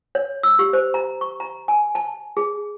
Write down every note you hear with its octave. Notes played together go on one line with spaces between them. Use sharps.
C#5
E6
G4
C5
A#5
C#6
A#5
G#5
A5
G#4